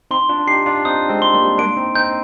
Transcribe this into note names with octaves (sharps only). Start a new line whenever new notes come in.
C4 D#4 C6
D4 F4
D#4 G4 C7
D4 F4
C4 D#4 D#6
G#3 C4
C6
G3 A#3
A#3 D4 D7
C4 D#4
C4 D#4 G6